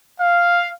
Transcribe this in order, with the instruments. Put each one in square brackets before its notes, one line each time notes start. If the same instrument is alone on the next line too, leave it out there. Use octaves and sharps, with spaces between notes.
[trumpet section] F5